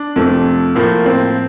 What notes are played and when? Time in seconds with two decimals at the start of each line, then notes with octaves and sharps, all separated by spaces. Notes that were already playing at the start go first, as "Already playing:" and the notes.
Already playing: D4
0.16 F2 C3 F3 A3
0.75 A2 F3 A#3
1.06 C4